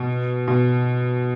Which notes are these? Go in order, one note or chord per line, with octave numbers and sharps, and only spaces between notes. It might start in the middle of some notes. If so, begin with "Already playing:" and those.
Already playing: B2
B2